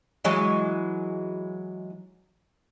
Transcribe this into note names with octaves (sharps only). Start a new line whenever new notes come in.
E3 F#3 G#3